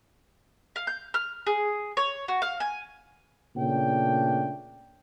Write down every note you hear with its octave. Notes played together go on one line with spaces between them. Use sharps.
F5
G6
F6
G#4
C#5
F#4
F5
G#5
A#2 C#3 A3 D4 G5